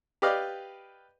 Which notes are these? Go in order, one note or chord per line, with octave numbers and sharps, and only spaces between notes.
G4 B4 D5 D#5 F5